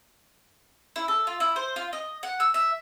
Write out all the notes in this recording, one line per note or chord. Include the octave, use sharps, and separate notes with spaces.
E4
A4
F4
E4
C5
F4
D#5
F#5
E6
E5